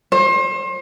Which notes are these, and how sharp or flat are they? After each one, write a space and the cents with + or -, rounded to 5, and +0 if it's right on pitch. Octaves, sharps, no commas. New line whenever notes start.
C5 +35